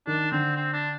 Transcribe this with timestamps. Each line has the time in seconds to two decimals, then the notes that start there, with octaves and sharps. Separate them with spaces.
0.07 D#3 D4
0.31 D3 C4
0.56 C4
0.73 D4